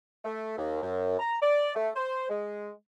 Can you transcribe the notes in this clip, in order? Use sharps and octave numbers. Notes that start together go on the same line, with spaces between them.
A3
D#2
F#2
A#5
D5
A3
C5
G#3